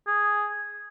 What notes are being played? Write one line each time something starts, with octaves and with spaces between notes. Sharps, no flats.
G#4